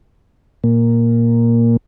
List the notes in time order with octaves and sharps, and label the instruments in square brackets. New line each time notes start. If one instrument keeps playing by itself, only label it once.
[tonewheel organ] A#2 A#3